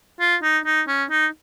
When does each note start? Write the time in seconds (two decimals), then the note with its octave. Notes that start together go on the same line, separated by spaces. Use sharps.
0.20 F4
0.42 D#4
0.66 D#4
0.88 C#4
1.11 D#4